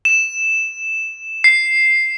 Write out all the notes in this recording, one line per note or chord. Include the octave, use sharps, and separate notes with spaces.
E7
C7